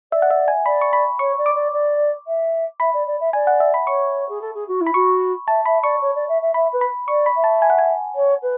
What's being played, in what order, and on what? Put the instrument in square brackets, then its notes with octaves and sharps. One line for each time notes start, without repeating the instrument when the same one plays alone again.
[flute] D5 [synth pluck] E5
[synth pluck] F#5
E5
G#5
[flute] D5 [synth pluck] B5
[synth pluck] C#6
B5
[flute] C#5 [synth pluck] C#6
[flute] D5
[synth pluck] D6
[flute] D5
D5
E5
[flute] E5 [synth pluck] B5
[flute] D5
D5
E5
[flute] D5 [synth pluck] G#5
[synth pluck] F#5
E5
B5
[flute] C#5 [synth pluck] C#6
[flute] G#4
A4
G#4
F#4
E4
[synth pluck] B5
[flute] F#4 [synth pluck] C#6
[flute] E5 [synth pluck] A5
[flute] E5 [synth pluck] B5
[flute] D5 [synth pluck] C#6
[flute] C#5
D5
E5
E5
[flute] E5 [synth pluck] B5
[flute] B4
[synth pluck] B5
[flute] D5 [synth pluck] C#6
[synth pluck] B5
[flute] E5
[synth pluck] A5
G#5
F#5
G#5
[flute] C#5
B4